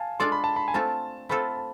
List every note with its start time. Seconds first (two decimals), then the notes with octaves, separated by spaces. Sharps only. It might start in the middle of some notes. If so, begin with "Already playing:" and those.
Already playing: F5 G#5 A5
0.20 G#3 D4 F4 A4 D5 C6
0.32 B5
0.44 A5
0.56 B5
0.68 G#5
0.74 A3 C4 F4 A4 A5
1.29 A3 C4 F4 A4 B5
1.57 A5